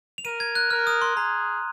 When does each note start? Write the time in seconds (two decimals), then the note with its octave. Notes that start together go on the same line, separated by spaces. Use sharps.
0.18 F7
0.25 A#4 D#7
0.40 G#6
0.55 F#6
0.70 A#4 F6
0.87 D#6
1.02 C6
1.17 G#4 A#5